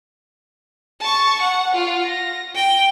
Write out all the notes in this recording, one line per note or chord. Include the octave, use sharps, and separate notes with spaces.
A5 C#6
F#5
F4
A#6
G5